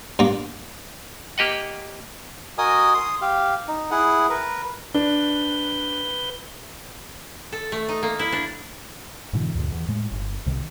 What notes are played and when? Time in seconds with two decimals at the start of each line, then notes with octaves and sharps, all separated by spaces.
0.19 G2 A#3
1.38 A#3 G4 D#5 F#5
2.58 F#4 A#4 D#5 G#5 D#6
2.94 C6 D#6
3.21 G4 F5
3.68 D#4
3.91 E4 G#4 F#5
4.30 A#4 B4
4.94 D4 B4 G6
7.52 A4
7.72 A3
7.88 D#4
8.03 A#3
8.19 E4
8.32 D4
9.33 G#2 B2 D3 E3
9.55 D2 G2 A#2 D3
9.72 E2
9.88 A2 G#3
10.11 G1
10.46 C2 C3 D#3